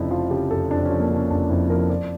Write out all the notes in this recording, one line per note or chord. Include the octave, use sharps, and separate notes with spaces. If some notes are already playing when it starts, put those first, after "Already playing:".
Already playing: F1 F2 C#3 D4 E4
F3 F4
C#3 G4
F1 A4
F2 D4
F3 C#4
A#3
C#3 C#4
F1 D4
F2 E4
F3 A#4
F3 D5